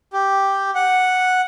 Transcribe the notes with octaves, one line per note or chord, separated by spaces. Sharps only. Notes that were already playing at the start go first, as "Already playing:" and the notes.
G4
F#5